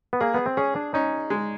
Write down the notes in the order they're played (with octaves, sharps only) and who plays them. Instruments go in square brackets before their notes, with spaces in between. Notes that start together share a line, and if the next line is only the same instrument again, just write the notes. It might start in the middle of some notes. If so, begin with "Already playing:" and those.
[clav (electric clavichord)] B3
[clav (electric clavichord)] A#3 [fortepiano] G#4
[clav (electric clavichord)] B3
C4
[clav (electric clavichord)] C#4 [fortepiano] G#4
[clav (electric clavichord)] D4
[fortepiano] C#4 [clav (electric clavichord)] D#4
[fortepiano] G#3